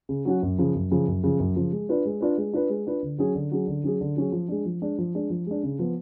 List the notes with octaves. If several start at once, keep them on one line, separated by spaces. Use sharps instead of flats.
C#3
F#3 C#4 F#4
F#2
C#3 F3
F#2
C#3 F3
F#2
C#3 F3
F#2
C#3 F3
G#3
D4 F4 B4
G#3
D4 F4 B4
G#3
D4 F4 B4
G#3
D4 F4 B4
D3
F#3 C#4 G#4
D3
F#3 C#4 G#4
D3
F#3 C#4 G#4
D3
F#3 C#4 G#4
F3
G#3 D4
F3
G#3 D4
F3
G#3 D4
F3
G#3 D4
C#3
F3 B3